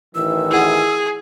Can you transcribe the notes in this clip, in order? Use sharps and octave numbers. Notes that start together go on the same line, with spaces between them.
A1 D#3 E3 E6
E4 G#4 A#4 F#5